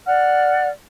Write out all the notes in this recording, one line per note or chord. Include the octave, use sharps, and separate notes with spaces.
D5 F#5 F6